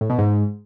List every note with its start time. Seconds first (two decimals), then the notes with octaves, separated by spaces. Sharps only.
0.01 A2
0.10 B2
0.18 G#2